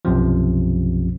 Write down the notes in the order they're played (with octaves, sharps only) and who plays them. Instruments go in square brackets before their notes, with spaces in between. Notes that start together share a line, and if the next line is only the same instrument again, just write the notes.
[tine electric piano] B1 F#2 C3 F3